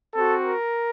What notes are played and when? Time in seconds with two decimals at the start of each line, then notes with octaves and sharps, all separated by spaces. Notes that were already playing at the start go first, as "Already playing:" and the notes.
0.14 C4 F#4 A4
0.43 A#4